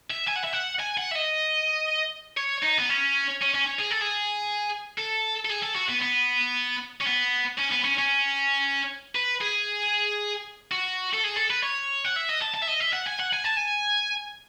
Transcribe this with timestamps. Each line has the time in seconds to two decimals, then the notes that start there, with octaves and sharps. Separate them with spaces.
0.11 E5
0.28 G#5
0.36 F#5
0.44 E5
0.53 F#5
0.80 G#5
0.98 F#5
1.11 E5
1.15 D#5
2.37 C#5
2.63 D#4
2.79 B3
2.89 C#4
3.41 C#4
3.54 C#4
3.80 G#4
3.91 A4
4.02 G#4
4.98 A4
5.45 A4
5.50 G#4
5.63 A4
5.75 F#4
5.89 B3
6.02 B3
7.01 C#4
7.06 B3
7.59 C#4
7.72 B3
7.84 C#4
7.98 C#4
9.15 B4
9.41 G#4
10.71 F#4
11.13 A4
11.24 G#4
11.37 A4
11.50 B4
11.63 C#5
12.05 F#5
12.16 E5
12.29 D#5
12.42 A5
12.54 A5
12.62 E5
12.68 D#5
12.80 E5
12.93 F#5
13.07 G#5
13.19 F#5
13.33 G#5
13.44 A5
13.56 G#5